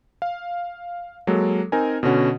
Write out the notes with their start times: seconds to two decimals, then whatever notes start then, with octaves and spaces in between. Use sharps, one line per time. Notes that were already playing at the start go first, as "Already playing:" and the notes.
0.22 F5
1.27 F#3 G#3 A#3 A4
1.72 C4 D#4 A#4 G#5
2.03 B2 D3 C#4 F#4